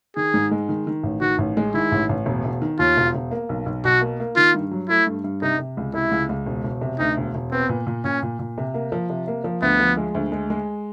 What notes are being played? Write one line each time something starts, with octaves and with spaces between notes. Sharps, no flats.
D#3 G#4
G#2
G#3
D#3
D#3
A1
D#3 F#4
A1
G#3
D#3 E4
A1
A1
E1
E1
D#3
D#2 F4
E1
E1
A#3
B1
B1
B2 F#4
A#3
A#3
D#3 F4
G2
F#3
A3 E4
G2
G2
C3 D#4
C3
C#2
C3 E4
C#2
C#2
E1
E1
C3
D2 D#4
E1
E1
B3 C4
A#2
A#2
A#2 C#4
A#2
A#2
C3
A#3
F3
C3
A#3
F3
D2 B3
F3
G#3
D2
G#3
G#3